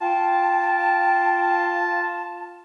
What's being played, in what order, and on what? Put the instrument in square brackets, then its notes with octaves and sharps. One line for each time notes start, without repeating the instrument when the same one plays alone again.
[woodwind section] F4 A5 [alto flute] G5